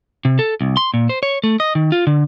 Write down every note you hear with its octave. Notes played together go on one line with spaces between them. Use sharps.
C3
A4
C2
C6
A#2
C5
C#5
A3
D#5
D#3
F4
D3